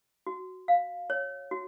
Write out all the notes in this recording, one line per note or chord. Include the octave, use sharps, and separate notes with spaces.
F#4
F5
C#5
F#4